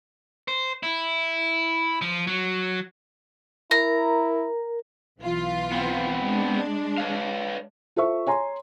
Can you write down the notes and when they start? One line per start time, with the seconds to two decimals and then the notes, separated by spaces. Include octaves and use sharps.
0.48 C5
0.83 E4
2.02 F3
2.27 F#3
3.71 E4 A#4 A#5
5.19 B1 E3 F4
5.72 B3 C4
6.22 G#3 D4
6.98 B4 C#5 F5
7.96 F4 A4 C5 E5 C#6
8.27 C#5 G#5 A#5 C6